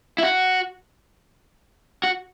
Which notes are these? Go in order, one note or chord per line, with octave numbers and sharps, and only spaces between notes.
E4
F#4
F#4